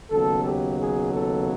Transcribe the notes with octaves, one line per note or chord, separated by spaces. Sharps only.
D#2 C#3 F#3 B3 A4
G4
G#4
A4